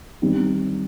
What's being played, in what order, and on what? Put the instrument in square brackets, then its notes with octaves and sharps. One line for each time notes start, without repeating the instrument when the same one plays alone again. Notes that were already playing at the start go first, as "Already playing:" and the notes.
[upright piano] D#3 G3 C4 D#4 G4